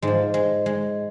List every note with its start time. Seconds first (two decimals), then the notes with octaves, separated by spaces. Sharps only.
0.02 G#2 F3 G#3
0.34 G#3
0.66 G#3